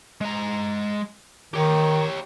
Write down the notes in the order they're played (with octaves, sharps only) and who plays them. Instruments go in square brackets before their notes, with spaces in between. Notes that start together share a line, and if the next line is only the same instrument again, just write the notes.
[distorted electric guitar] G#3 A#5
[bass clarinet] D#3 [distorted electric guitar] G4 C#5